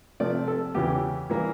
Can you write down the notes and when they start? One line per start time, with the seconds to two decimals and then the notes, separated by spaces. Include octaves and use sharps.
0.20 C3 F3 A3 D5
0.48 A4
0.75 E2 C#3 E3 G4
1.30 E3 G3 A#3